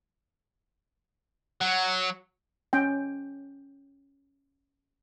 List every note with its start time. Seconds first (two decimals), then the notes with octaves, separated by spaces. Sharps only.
1.61 F#3
2.73 C#4 G5